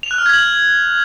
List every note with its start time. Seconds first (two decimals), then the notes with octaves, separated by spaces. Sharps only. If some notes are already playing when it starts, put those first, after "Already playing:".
0.03 F7
0.11 F#6
0.18 F6
0.26 G#6
0.33 F#7